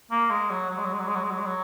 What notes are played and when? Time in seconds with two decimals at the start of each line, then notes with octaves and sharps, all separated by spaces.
0.11 A#3
0.30 G#3
0.50 F#3
0.70 F#3
0.78 G#3
0.85 F#3
0.93 G#3
1.00 F#3
1.08 G#3
1.15 F#3
1.23 G#3
1.31 F#3
1.39 G#3
1.46 F#3